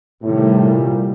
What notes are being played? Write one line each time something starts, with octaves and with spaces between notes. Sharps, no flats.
A2 C3 D#3 G3
A#2